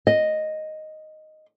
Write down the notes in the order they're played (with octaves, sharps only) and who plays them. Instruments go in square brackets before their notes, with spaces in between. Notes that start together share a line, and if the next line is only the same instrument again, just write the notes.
[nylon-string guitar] D#5